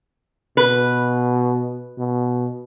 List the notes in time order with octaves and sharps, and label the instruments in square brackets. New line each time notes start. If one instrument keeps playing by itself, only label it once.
[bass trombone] B2 [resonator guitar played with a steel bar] B4
[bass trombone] B2